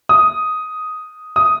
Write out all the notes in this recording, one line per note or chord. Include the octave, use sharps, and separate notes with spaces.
D#6
D#6